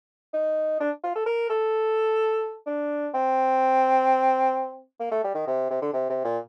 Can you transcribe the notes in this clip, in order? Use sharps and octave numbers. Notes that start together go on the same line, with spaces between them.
D#4
D4
F4
A4
A#4
A4
D4
C4
A#3
A3
G3
D#3
C3
C3
D3
C3
C3
A#2